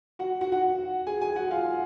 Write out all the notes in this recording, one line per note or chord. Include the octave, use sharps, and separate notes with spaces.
F#4 F#5
F#4 F#5
F#4 F#5
G#4 G#5
G#4 G#5
F#4 F#5
F4 F5